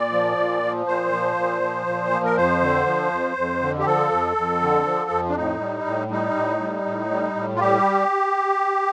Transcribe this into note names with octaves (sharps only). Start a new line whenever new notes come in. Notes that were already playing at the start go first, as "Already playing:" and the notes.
Already playing: A#2 D5
F3
A#2
F3
A#2 C5
F3
A#2
F3
A#2
F3
A#4
F2 C5
D3
F3
F2
F2
D3
G4
F3 A4
F2
F2
D3
F3
F2
D4
A2 D#4
G3
A2
G3 D#4
A2
G3
A2
G3
A2
F4
G3 G4